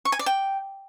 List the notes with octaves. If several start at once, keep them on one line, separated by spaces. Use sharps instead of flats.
C#6
G#5
D5
G5